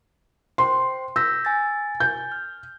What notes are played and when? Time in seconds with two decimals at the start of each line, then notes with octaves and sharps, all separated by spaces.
0.58 C5 G5 C6
1.16 E6 G6 A#6 B6
1.45 G#5 A6
2.00 G6
2.32 F6